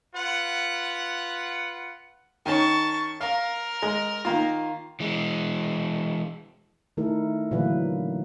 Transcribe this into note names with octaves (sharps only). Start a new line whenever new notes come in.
F4 B4 F#5
D#3 C#4 A5 C#6
A#4 F5
G#3
D#3 A#3 F4
E3 G#3
D#3 A3 E4 A4 A#4
A#2 D3 E3 F#3 A#3 B4